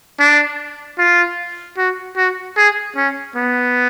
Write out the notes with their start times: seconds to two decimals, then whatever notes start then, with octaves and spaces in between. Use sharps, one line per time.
0.19 D4
0.99 F4
1.78 F#4
2.17 F#4
2.57 G#4
2.96 C#4
3.36 B3